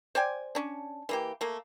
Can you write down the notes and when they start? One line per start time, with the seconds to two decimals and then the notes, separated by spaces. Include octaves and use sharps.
0.15 C5 D5 G5 G#5
0.55 C#4 D4
1.09 E3 A#3 G4
1.41 A3 A#3